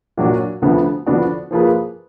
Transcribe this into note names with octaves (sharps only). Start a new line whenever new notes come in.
A#2 F#3 D4 F#4
D2 D3 F3 B3
D3 F3 B3 D4 F#4
F3 A#3 F4 G#4 B4